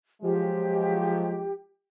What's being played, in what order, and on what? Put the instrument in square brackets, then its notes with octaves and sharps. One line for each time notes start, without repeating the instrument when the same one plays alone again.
[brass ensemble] F3 F#3 G#3 [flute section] G4